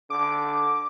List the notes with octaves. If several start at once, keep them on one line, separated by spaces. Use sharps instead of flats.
D3 D6